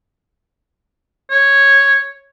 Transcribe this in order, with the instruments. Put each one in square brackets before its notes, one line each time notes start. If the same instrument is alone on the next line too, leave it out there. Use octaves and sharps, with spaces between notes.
[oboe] C#5